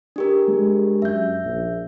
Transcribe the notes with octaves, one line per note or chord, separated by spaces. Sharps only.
D4 G4 A#4
G#3
F#2 E5 G6
A#1